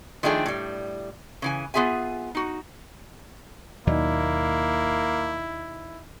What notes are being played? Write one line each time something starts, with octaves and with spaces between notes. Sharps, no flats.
D#3 F3 A3 D4 G#4 G5
A2 G3
C#3 E3 G#5
B3 F4 G#4 E5 G#5
D#4 F#4
D#2 B2 F#3 A#3 D#4 E4 D5 D#5